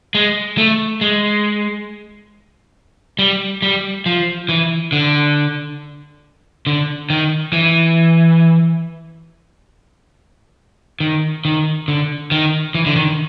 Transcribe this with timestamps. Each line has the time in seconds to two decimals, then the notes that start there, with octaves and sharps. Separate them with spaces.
0.15 G#3
0.58 A3
1.01 G#3
3.19 G3
3.62 G3
4.06 F3
4.49 E3
4.92 D3
6.67 D3
7.10 D#3
7.53 E3
11.00 D#3
11.45 D#3
11.88 D3
12.31 D#3
12.75 E3
12.86 D3
12.96 D#3